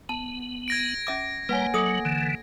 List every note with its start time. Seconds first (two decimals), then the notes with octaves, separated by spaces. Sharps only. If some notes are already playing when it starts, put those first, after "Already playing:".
0.09 B3 A5
0.68 G#6 A#6 D7
1.07 C#4 E5 D6
1.49 G3 A#3 B4 C#5 F#5 G#5 A#5
1.74 F#3 A4 D#5 D#6
2.05 D3 E3